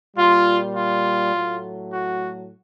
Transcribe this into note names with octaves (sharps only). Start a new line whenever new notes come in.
A#2 G3 F4
F4
A2 F#3 A3
F#4